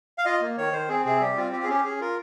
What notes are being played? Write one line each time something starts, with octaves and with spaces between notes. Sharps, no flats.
F5
F4 D#5
A#3
D#3 C#5
D#3 C5
C4 G#4
C3 G#4
G3 G4
C4 F4
F4 G4
G#4
C#4 G4
C#4 G#4
F4 A#4